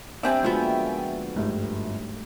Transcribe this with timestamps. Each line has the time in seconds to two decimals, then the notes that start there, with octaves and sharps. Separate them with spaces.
0.23 G3 C4 D4 E5 G5 G#5
0.43 D2 F3 G#3 B3 D4 F4 F#4
0.62 A#3
1.36 G1 G#2 G3 A3 G4